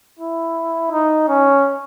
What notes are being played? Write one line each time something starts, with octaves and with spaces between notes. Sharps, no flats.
E4
D#4
C#4